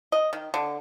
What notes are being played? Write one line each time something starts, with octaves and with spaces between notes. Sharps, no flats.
D#5
D#3
D3